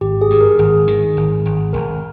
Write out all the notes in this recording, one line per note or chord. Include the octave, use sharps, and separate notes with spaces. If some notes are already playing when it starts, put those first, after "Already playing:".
G#1 G4
G#4
G2
A#4
G#1 G#4
D#3
G#1
G#1
G#1 A#4